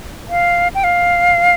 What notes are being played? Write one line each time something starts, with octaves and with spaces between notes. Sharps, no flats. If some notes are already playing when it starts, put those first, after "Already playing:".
F5
G5
F5